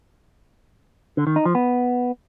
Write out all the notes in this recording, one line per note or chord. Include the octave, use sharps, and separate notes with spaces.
D3
D#3
D#4
F3
B3